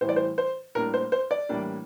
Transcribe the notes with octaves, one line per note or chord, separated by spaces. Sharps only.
A2 E3 G3 C5
D5
C5
C5
A2 G3 A#3 D4 A#4
C5
C5
D5
A2 E3 G3 A#3 D4